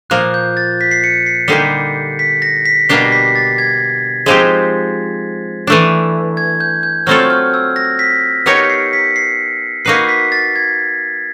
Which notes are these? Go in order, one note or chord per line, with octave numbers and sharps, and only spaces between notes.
A#2 F3 A#3 F#6
G6
A6
B6
C7
C#7
C7
D3 G3 A#3 D#4 G4 C7
B6
A#6
B6
B2 G3 A#3 D4 G4 C7
B6
A6
G#6
F3 G#3 C4 D#4 G4
E3 A3 D4
G#6
G6
G6
F#3 A3 C4 F4 A4 F6
F6
E6
A#6
B6
B3 D#4 G4 A#4 C#5 C#7
C7
B6
C7
A#3 D#4 F#4 B4 C7
B6
A6
G#6